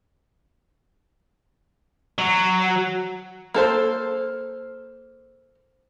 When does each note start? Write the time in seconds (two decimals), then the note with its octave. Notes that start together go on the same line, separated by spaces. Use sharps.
2.18 F#3
3.54 A#3 A4 C5